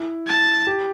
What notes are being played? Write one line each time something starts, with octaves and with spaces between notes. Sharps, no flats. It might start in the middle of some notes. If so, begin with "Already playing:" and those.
Already playing: E4
A5
G4